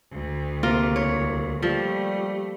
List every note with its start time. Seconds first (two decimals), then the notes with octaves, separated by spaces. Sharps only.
0.12 D2
0.63 C3 A#3 F4
0.96 C2 C#5
1.63 F3 G3 A3